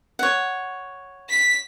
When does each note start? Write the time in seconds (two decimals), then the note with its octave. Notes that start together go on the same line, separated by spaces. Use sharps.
0.19 C#5 F#5
1.29 B6